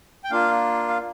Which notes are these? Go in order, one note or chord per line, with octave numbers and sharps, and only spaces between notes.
G5
A#3 D4 F4 F5
F5